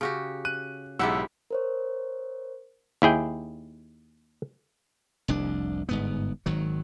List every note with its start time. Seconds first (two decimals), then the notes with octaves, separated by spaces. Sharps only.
0.01 C#3 F#4 G4
0.45 F#6 D#7
0.99 B1 G#2 E4 G4 F#5 E6
1.51 A#4 C5 C#5
3.02 D#2 E4 G#4 G5
5.28 F1 C2 D4
5.89 G1 G#2 B3
6.46 G#1 D#3 F#3